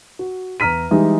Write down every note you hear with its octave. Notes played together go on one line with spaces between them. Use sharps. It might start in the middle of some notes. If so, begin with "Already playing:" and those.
F#4
E2 A#5 F6 B6 D#7
E3 G3 G#3 D#4